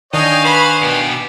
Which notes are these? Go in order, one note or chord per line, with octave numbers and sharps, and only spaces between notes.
D#3 D4 C#5 D#5 F5 G5 G#5 D#6
B4 C5 B5 C#6
B2 B3 G4